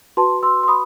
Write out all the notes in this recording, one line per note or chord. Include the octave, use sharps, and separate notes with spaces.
F#4 B4 A5 C6
C6 E6
C6
B5 D#6